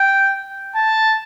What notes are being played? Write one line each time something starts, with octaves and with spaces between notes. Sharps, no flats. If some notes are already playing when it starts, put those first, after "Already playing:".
Already playing: G5
A5